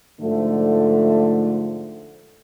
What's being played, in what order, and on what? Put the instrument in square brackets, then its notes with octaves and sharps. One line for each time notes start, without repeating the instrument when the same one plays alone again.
[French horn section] G#2 D3 F3 A3